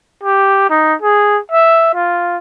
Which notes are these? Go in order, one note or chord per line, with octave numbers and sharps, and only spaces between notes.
G4
D#4
G#4
E5
F4